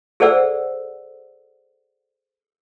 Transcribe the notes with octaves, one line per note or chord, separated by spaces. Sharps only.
G#4 A4 C5 D5 F#5 E6